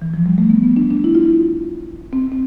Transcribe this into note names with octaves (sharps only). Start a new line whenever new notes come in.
E3
F3
G3
A3
B3
B3
D4
D4
E4
F4
E4
C4
C4